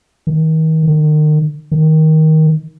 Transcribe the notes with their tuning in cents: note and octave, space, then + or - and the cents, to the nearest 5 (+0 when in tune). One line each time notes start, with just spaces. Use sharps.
D#3 +35
D#3 -35
D#3 +15